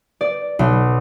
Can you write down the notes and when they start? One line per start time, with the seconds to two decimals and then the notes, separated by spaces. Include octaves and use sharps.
0.21 D5
0.59 B1